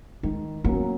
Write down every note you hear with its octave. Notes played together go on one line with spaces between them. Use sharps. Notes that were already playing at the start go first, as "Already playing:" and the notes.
D#3 G#3
F#3 A#3 B3 C#4